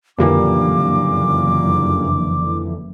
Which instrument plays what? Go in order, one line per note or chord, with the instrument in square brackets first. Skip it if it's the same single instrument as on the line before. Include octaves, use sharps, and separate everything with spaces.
[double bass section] F#1 [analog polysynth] F2 D3 E3 [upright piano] A#2 G3 A#3 [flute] D6